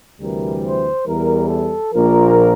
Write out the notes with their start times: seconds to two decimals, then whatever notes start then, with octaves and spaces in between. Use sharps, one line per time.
0.20 D2 C3 E3 G3 A#4
0.63 C5
1.06 E2 E3 G3 A#4
1.49 A4
1.92 A#1 A#2 F3 A#4